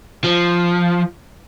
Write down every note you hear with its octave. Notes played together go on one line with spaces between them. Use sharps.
F3